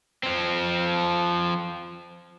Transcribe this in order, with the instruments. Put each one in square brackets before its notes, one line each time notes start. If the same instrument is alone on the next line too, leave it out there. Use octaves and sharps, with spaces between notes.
[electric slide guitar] F3 C4